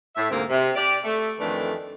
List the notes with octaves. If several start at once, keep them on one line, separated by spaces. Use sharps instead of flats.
A2 E5
D2 G#2 C3 A#3 C4
C3
G4 D5
A3
F2 D#3 E3 A3 D4